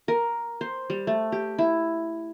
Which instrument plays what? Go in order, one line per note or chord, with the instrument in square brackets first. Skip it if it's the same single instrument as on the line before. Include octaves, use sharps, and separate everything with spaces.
[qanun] A#4
C5
G3
A3
G4
E4